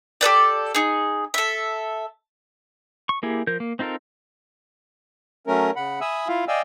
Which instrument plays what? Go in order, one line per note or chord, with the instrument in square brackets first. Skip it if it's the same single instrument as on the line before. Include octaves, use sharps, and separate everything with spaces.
[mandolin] G4 A4 B4 D5
D#4 G#4
A4 E5
[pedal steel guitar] C#6
A#3 E4 G4 G#4
F3 A#4 G6
A#3
C4 D#4 F4 A4 A#4
[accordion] F#3 A3 C#4 A#4
C#3 F#5 B5
E5 G#5 B5 D#6 E6
E4 F4 F5
D5 D#5 F5 G5 G#5 E6